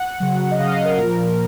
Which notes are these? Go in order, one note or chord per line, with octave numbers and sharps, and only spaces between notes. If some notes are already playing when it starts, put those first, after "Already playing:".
Already playing: F#5
C#3 F#3
D#5
C#3 F#3 F5
D#5
A#4
A#2 F3